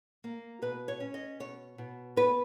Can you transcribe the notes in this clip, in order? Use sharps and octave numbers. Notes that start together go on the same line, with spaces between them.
A#3
B2 B4
C#5
C#4
D#5
B2 C#5
B2
B3 B4